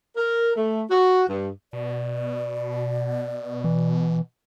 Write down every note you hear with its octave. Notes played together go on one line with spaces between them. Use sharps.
A#4
A3
F#4
G2
B2 D5
E3